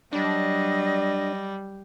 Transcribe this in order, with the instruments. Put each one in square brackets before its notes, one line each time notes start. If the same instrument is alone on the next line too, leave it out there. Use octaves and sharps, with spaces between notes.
[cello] F#3 D#5 [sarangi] G3 [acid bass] D4